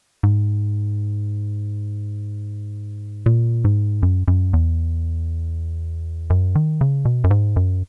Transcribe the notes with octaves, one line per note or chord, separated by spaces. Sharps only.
G#2
A#2
G#2
F#2
F#2
E2
F#2
D#3
C#3
B2
F#2
G#2
F#2